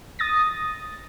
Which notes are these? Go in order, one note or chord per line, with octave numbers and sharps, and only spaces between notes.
D#6 A6 A#6